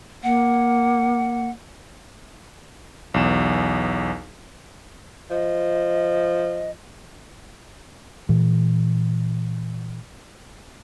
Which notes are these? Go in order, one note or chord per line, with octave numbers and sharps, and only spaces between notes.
A#3 F#5
B1 E2 E7
F3 D#5
A#2 E3